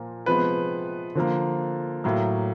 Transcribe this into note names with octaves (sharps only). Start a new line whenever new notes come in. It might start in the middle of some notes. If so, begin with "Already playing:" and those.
Already playing: A#2 F3 A#3
C3 F3 G#3 B3 B4
D3 F3 A#3
A2 F#3 A#3